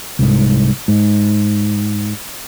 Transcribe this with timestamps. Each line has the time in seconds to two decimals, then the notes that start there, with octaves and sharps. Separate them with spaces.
0.19 C2 G#2
0.88 G#2